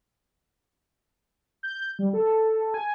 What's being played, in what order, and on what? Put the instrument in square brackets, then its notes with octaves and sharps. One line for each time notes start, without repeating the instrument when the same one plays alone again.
[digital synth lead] G6
G3
A4
G#5